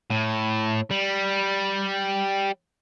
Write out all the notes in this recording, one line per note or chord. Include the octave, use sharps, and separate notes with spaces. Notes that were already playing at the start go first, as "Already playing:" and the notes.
A2
G3